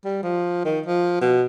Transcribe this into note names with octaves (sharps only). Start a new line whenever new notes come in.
G3
F3
D#3
F3
B2